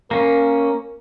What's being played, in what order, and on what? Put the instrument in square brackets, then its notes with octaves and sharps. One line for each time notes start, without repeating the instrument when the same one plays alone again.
[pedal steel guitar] A#3 C#4 [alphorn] A#4